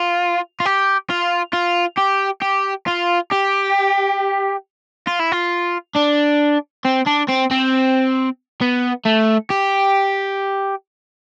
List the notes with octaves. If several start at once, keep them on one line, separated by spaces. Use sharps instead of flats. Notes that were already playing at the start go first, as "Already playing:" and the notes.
Already playing: F4
F4
G4
F4
F4
G4
G4
F4
G4
F4
E4
F4
D4
C4
D4
C4
C4
B3
A3
G4